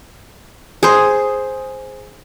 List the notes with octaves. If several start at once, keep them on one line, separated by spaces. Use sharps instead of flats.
G#4 C5